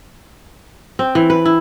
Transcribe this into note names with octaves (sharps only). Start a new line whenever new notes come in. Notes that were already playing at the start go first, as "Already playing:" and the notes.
C4
E3
B4
E4